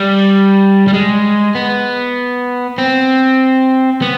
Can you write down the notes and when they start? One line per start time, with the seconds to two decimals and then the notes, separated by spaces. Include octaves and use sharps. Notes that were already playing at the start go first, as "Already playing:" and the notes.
Already playing: G3
0.87 G3
0.93 G#3
1.55 B3
2.78 C4
4.02 B3